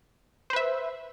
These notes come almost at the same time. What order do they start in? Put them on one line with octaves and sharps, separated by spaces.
C5 B4 E5